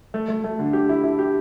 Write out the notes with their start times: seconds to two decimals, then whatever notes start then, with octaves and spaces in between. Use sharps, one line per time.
0.14 A3
0.28 A3
0.44 A3
0.59 D3
0.73 G4
0.89 E4
1.04 E4
1.19 G4